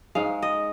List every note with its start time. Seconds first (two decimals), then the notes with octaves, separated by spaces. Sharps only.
0.15 G#2 G#3 F5
0.42 D#5